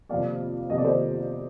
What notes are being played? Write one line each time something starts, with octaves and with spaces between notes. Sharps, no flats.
F2 C3 F3 A#3 D5 F5
F2 C3 F3 A#3 D#5
D5
C5 D#5